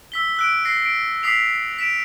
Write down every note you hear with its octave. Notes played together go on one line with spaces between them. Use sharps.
E6 B6 G7
E6 F#6 D7
A#6 C7
D7
D#6 B6 C7 F7
B6 D7 E7